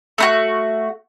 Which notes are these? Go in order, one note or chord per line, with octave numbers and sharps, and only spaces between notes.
A3 D#4 F#4